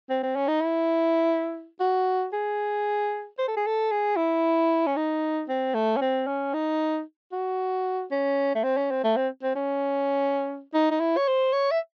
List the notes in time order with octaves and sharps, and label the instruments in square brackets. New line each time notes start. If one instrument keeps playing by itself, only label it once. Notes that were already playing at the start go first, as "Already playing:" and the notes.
[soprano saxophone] C4
C4
C#4
D#4
E4
F#4
G#4
C5
A4
G#4
A4
G#4
E4
C#4
D#4
C4
A3
C#4
C4
C#4
D#4
F#4
C#4
A3
C4
C#4
C4
A3
C4
C4
C#4
D#4
D#4
E4
C#5
C5
C#5
E5